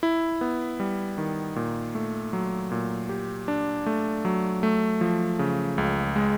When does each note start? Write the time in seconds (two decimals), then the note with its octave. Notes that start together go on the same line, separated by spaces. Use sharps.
0.03 E4
0.41 B3
0.80 G3
1.18 D#3
1.56 A#2
1.95 A3
2.33 F#3
2.71 A#2
3.09 G4
3.48 D4
3.86 A3
4.25 F#3
4.63 A3
5.01 F3
5.39 C#3
5.78 C#2
6.16 G#3